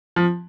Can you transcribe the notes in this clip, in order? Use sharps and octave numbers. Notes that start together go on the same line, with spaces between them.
F3